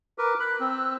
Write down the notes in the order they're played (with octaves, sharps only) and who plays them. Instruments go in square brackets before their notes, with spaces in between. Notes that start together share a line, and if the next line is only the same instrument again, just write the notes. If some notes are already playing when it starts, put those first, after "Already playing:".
[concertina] A#4 B4 [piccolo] D6
[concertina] B5 [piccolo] F#6
[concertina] C4 [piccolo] E6